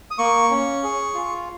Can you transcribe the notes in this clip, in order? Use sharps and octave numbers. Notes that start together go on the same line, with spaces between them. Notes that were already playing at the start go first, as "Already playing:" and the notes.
D#6
A#3 C#6
C#4
G#4
F4